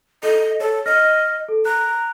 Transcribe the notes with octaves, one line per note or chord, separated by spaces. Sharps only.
A4 D#5
A4 C#5
D#5 F6 A#6
A4
A#5 F#6